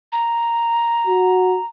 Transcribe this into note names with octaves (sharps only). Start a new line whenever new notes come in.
A#5
F#4